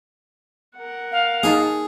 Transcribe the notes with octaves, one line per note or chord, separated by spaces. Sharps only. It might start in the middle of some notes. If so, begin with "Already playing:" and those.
A#4 F#5
F5
A#3 D#4 G#4 A5